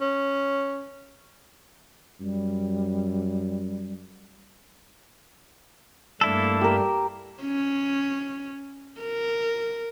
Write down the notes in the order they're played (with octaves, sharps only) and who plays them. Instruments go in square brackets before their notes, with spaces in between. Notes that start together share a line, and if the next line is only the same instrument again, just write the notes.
[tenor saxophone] C#4
[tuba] F#2 [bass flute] G3
[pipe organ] G2 A3 D4 [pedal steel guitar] A#3 E4 A4
[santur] G4 A#4
[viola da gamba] C#4
A#4